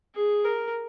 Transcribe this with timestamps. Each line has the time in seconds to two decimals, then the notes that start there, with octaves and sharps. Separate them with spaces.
0.15 G#4
0.45 A#4